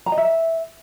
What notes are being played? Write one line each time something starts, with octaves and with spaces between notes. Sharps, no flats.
A#5
D#5
E5